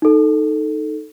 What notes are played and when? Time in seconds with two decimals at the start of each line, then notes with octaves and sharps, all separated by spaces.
0.02 D#4 A4